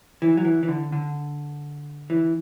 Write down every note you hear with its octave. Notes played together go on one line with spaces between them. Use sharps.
E3
F#3
E3
E3
D3
D3
E3